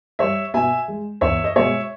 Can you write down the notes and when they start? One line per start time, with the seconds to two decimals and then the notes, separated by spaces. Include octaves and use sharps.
0.19 G3 C#5 E5
0.54 B2 E5 G#5
0.88 G#3
1.21 E2 C#5 E5
1.44 D#5
1.56 B2 G#3 C#5 E5